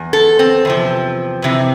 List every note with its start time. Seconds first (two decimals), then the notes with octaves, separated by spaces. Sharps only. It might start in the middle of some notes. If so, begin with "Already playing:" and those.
Already playing: E2
0.13 A4
0.39 C4
0.65 E2 C3 F3
1.42 F2 C3 E3